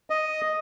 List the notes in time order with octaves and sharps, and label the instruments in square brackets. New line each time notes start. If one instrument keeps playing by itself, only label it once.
[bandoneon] D#5